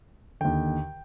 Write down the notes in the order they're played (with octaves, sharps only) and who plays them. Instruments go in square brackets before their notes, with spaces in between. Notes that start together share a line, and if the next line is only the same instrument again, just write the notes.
[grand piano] D#2 D3 G5